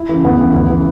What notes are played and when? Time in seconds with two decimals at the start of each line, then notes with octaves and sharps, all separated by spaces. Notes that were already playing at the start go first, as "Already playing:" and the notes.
Already playing: E4
0.09 C#3 E3
0.24 D2 B3
0.39 C#3 E3
0.54 D2
0.69 C#3 E3